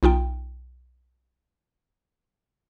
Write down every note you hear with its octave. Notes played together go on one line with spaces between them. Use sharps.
B1 D#4 F4 G5